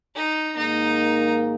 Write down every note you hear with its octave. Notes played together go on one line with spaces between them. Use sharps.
D#4
G#2 D#3 A#3 D#4